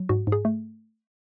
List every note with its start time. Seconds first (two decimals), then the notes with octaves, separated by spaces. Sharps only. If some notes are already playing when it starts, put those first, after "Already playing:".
Already playing: F#3
0.09 G#2 F#4
0.27 G#2
0.32 G#4
0.45 A3